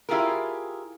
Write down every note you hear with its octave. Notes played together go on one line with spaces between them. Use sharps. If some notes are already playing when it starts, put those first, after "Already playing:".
E4 F4 G4 G#4 A#4